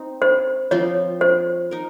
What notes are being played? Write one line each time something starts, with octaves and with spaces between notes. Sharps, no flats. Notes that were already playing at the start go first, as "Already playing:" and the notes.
Already playing: C4 D#4
C5
F3 C4 F4 C#5
C5
D#4 A#4